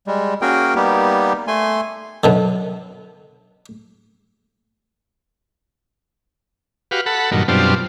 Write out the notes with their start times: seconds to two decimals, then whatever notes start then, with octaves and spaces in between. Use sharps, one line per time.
0.07 G3 G#3
0.42 A#3 C#4 F#4 G#4 A#4 G5
0.75 G3 A#3 B3 D#4 G4
1.48 A3 G#5 C6
2.24 F#2 B2 D3
6.91 F#4 G4 B4 F5
7.06 A4 F#5 B5
7.31 G2 A#2 D#3 F#3
7.48 F#2 B2 G3 C4 D4 F4